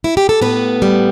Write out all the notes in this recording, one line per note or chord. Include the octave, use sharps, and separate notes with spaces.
E4
G4
A4
A2 B3 B4
G3